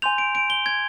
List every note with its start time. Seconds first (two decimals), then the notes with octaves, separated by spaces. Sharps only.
0.02 G#5 C6 G6 F7
0.18 D7
0.35 D7
0.50 G7
0.66 G#6